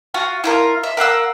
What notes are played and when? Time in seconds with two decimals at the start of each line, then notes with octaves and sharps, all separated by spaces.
0.14 F4 F#4 F5
0.44 E4 F4 A#4
0.83 E5
0.97 A#4 F5 F#5 E6